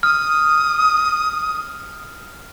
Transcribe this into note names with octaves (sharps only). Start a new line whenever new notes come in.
D#6 F6